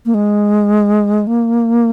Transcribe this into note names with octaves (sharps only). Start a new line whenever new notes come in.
A#3
G#3
A#3